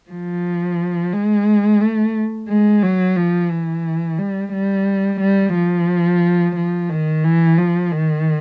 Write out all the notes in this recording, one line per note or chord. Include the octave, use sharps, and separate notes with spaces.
F3
G#3
A3
G#3
F#3
F3
E3
G3
G3
G3
F3
F3
D#3
E3
F3
D#3